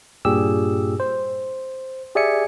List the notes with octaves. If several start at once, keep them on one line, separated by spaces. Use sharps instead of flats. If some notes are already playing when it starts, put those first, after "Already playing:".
G2 A#2 G4 G#4 E6
C5
G4 G#4 D5 E5 G#5 C#7